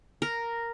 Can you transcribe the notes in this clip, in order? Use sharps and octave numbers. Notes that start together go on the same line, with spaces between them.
A#4